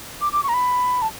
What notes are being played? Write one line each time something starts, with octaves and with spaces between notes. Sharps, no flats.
D6
D6
C#6
A#5
B5
A5